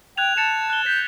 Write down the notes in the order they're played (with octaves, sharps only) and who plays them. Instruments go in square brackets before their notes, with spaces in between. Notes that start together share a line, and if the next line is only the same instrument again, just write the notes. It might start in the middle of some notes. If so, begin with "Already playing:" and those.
[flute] G5 [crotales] F#6 G#6 F7
[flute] A5 [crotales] A6 C#7 E7
[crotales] F#6 G7
[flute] G6 [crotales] B6